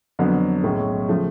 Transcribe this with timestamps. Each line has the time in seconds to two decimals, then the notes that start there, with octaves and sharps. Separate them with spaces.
0.19 F2 D3 F#3 B3
0.63 B1 A2 G#3 C#4
1.09 C#3 F3 A3